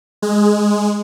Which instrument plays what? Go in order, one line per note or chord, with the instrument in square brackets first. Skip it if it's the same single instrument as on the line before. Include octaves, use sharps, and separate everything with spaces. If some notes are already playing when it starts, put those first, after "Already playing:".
[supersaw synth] G#3